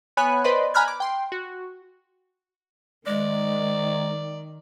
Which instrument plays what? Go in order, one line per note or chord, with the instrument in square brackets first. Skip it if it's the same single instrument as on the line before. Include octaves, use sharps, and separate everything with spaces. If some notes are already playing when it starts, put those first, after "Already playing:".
[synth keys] B3 C#5 G#5 B5 F#6 D#7
B4 C5 D5 D#5 B5 C6
G#5 A#5 B5 F6 F#6 G#6
D6
G5 C6
F#4
[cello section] D#3 [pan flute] G#3 [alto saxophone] D5